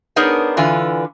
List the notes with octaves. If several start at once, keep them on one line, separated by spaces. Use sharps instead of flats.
B3 D4 D#4 G#4 A#4 C#5
D3 E3 F4 B4 G#5